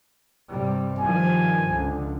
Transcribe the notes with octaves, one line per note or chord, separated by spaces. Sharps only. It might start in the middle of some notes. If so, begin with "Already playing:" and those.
G2 C3 G3
G2 D#3 F3 G#5
C#2 D3